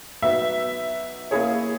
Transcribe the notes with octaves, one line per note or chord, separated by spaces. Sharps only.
F#3 B3 D#4 E5
A#3 C#4 E4 G#4 C#5